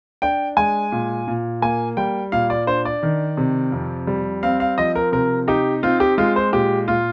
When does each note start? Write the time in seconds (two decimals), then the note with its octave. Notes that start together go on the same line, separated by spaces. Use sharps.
0.22 D4 G5
0.57 G#3 G#5
0.92 A#2
1.28 A#2
1.62 A#3 G#5
1.97 G3 G5
2.32 A#2 F5
2.50 D5
2.67 D4 C5
2.85 D5
3.03 D#3
3.37 C3
3.72 F2
4.07 G3
4.43 C4 F5
4.60 F5
4.78 F3 D#5
4.95 A#4
5.12 C3 A#4
5.48 D#4 G4
5.83 C4 F4
6.00 G4
6.18 G#3 F4
6.36 C5
6.53 A#2 G4
6.88 A#2 F4